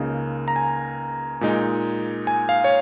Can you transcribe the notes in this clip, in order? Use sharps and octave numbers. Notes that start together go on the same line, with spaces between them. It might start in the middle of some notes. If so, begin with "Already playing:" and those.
Already playing: C#2 C#3 A#3 D#4
A#5
G#5
A#2 G#3 D#4
G#5
F5
C#5